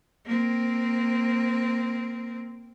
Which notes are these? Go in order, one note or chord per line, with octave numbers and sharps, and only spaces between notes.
A#3 C4